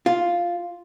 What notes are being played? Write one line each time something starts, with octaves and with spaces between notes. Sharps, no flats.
F4